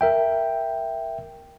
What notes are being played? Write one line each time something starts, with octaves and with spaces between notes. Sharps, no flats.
A#4 E5 G5